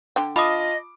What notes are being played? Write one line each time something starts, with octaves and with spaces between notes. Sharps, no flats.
D3 G5
F4 D#5 A5 B5 D6 D#6